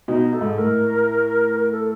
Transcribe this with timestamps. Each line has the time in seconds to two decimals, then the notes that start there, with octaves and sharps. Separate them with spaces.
0.08 B2 D#4
0.33 A4
0.41 G#2
0.58 A2 A#4
1.55 A#4
1.72 A4